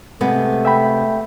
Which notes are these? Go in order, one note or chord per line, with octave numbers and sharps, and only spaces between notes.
C3 G#3 A3 B3
E5 G5 B5